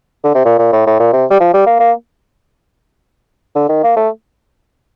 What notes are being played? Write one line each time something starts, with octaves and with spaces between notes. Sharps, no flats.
D3
C3
A#2
A#2
A2
A2
A#2
C3
G3
F3
G3
A#3
A#3
D3
D#3
A#3
A3